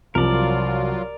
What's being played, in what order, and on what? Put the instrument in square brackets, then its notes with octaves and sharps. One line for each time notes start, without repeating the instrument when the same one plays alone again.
[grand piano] C2 F3 [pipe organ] F#3 F4 [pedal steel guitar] A#4 D5